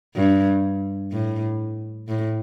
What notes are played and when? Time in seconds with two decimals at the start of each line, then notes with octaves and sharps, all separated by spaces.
0.16 G2
1.12 A2
2.09 A2